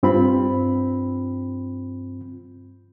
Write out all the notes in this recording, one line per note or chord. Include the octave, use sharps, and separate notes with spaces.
G2 C4 F4 B5